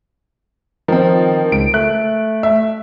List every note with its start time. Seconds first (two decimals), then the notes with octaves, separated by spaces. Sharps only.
0.88 D#3 F3 C4
1.52 C#2 D7
1.74 A3 F#6
2.43 E5